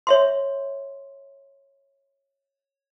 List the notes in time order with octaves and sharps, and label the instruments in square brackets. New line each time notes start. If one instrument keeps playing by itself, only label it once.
[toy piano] C#5 E5 C6